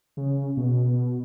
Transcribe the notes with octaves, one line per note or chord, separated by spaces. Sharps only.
C#3
B2